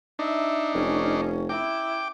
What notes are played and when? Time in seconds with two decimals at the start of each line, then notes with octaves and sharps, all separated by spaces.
0.19 D4 D#4 E5
0.74 F1 C#4
1.49 E4 G5 D6